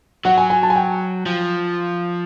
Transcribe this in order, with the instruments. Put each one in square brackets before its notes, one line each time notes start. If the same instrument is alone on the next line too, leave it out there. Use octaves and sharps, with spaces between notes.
[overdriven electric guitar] F#3 [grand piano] F#5
[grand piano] G#5
G#5
A5
G#5
G5
[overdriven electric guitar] F3